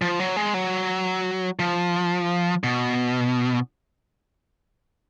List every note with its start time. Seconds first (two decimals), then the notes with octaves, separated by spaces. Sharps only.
0.02 F3
0.20 F#3
0.36 G#3
0.54 F#3
1.59 F3
2.64 B2